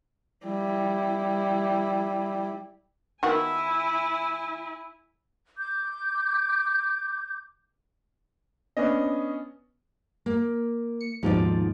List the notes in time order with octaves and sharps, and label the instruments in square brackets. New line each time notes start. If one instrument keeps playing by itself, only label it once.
[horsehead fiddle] G3 E4
[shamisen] D#3 B3 F#4 [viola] E4 G#5
[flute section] D6 G6
[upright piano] B3 C#4 D4 D#5
[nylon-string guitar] A#3
[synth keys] C#7
[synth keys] D#2 G#2 B2 [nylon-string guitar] F3 F4 D5